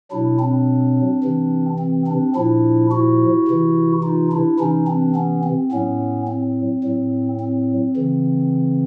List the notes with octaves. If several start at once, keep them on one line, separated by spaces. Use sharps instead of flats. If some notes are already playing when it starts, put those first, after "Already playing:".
B2 F#3 D4 E4
C4 D4
C3 E3
C4
C4 D4
A#2 F3 D4 E4
E4 F#4
C3 E3
D#4 F4
D4 E4
C3 E3 C#4 D#4
C4 D4
B3 C#4
C4
A2 F#3 B3 C#4
C4
A2 F#3
C4
C#3 E3